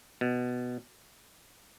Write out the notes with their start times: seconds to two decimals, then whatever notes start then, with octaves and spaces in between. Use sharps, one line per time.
0.21 B2